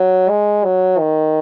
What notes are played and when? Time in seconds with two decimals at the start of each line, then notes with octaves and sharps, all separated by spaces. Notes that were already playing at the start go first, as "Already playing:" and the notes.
Already playing: F#3
0.29 G#3
0.64 F#3
0.99 D#3